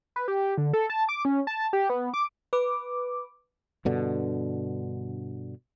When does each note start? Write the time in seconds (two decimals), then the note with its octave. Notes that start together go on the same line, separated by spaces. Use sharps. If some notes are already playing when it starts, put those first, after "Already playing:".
0.16 B4
0.28 G4
0.58 D3
0.73 A4
0.90 A5
1.09 D6
1.25 C#4
1.47 A5
1.73 G4
1.90 B3
2.14 D6
2.53 B4 D6
3.85 G2 B2 D3